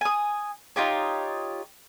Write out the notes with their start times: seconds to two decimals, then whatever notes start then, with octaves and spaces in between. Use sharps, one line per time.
0.01 G#5 D#6
0.76 D#4 F4 G4 C#5